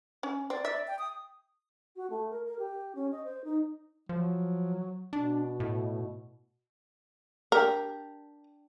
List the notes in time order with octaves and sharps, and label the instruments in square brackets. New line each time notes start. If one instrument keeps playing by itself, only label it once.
[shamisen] C#4
[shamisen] C4 [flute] D5
[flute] D5 [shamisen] E5
[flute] G5
D#6
[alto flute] F#4
A3
A#4
A#4
G4
C#4
D#5
C5
D#4
[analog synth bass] F3 [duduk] F#3
[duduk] B2 [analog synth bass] D4
[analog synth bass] A2
[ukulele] D4 G4 [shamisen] A#4